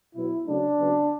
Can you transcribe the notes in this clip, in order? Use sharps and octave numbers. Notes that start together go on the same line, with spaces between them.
B2 F#3 B3 E4
C#3 F#3 A3 D4
C#3 F#3 B3